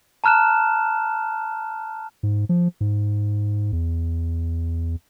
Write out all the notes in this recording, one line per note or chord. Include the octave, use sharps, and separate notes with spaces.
A5 A#5 F6 F#6 E7
G#2
F3
G#2
E2